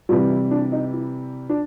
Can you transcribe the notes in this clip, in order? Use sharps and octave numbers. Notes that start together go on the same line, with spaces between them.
C3 E3 G3 F4
E4
D4
D#4
E4
D4